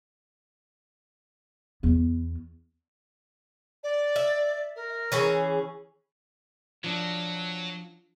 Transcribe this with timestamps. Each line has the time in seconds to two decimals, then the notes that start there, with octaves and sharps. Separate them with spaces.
1.83 E2 B3
3.83 D5
4.16 E5
4.76 A#4
5.12 E3 C#4 G#4
6.84 F3 F#3 D4